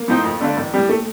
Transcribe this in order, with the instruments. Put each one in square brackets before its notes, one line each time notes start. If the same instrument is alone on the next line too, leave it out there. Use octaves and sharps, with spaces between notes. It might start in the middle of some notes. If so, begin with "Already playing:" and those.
Already playing: [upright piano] A#3
[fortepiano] A2 F3 C4 D#4
F2
D3 A3 D4 F4
A1
A2 G3
[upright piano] A3